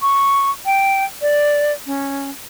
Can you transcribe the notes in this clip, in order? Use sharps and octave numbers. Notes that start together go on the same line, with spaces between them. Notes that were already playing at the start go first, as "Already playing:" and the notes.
C#6
G5
D5
C#4